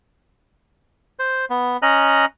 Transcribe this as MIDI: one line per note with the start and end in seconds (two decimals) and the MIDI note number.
1.19 1.45 72
1.50 1.77 59
1.82 2.25 61
1.82 2.25 75
1.82 2.25 82
1.82 2.25 90